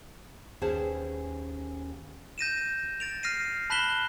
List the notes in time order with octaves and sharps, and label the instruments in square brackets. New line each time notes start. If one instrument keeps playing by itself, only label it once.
[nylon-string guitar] D#2 C#4 G#4 B4 C5 A5
[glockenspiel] G6 A#6 D#7 E7
A6 D7 F7
F6 A#6 C7 D#7
A5 B5 F#6 B6 E7 G7